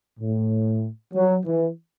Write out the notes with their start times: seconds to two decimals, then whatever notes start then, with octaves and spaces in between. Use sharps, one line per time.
0.20 A2
1.14 F#3
1.45 E3